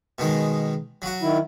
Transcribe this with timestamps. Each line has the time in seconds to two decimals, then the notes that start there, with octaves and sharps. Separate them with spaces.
0.18 B2 D#3 G#3
1.02 F#3 F#4
1.22 D#3 E4